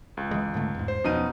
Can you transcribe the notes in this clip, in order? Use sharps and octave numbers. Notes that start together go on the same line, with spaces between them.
C#2
E3 G#3
G#2 D3 A3
E2 G#2
C5
E2 B2 F3 C#4 D#4 D#7